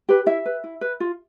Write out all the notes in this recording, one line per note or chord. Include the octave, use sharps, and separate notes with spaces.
G4 B4
E4 E5
B4
E4
B4
F4